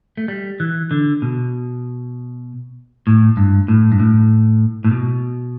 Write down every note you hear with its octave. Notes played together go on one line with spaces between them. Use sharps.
A3
G3
E3
D3
B2
A2
G2
A2
G2
A2
A2
B2